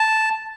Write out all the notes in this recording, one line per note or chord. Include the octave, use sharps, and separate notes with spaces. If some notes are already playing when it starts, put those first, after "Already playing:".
Already playing: A5